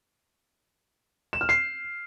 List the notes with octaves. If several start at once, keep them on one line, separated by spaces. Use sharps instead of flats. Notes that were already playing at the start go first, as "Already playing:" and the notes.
E7
F6
C7